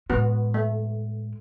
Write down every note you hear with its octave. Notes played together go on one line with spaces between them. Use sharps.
A2 G#3 B3 F#4
A3